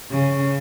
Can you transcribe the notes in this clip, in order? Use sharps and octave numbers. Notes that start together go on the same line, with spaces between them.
C#3